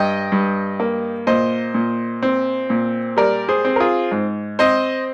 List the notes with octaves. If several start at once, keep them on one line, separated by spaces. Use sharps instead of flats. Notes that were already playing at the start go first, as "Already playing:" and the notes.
Already playing: G2 D#5 G5
G2
A#3
A#2 C5 D#5
A#2
C4
A#2
G3 A#4 D5
G#4 C5
C4
A#4
F4 G#4
G#2
C4 C5 D#5